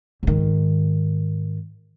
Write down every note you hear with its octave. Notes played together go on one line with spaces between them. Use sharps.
G#2 D#3